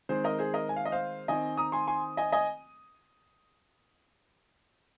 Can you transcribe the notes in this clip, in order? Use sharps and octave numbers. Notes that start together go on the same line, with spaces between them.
D#3 G#3 C4 G#4 C5
A#4 D#5
G#4 C5
A#4 D#5
G#5
F5
D#5
C5 F5
D#3 C4 D#5 G#5
A#5 D#6
G#5 C6
G#5 C6
D#5 G#5
D#5 G#5